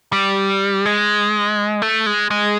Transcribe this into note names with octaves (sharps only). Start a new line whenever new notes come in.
G3
G#3
A3
G#3
G#3